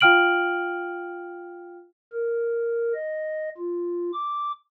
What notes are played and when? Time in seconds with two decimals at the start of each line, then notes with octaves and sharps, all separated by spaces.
0.01 F4 F5 G5 F6 D7 F#7
2.13 A#4
2.95 D#5
3.58 F4
4.13 D6